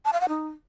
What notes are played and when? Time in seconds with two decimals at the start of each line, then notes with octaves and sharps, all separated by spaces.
0.05 A5
0.13 F5
0.21 F#5
0.29 D#4